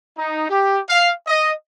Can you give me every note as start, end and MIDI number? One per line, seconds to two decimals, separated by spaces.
0.17 0.46 63
0.49 0.79 67
0.89 1.12 77
1.27 1.52 75